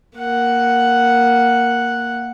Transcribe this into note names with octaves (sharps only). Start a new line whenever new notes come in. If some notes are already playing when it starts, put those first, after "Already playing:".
A#3 F#5